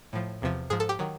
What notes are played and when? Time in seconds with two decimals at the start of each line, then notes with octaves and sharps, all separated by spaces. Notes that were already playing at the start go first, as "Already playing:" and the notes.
0.13 A2 F3
0.42 E2 C3 F3
0.70 G#2 F3 G#4
0.80 A4
0.89 G4
0.99 D#3 F#3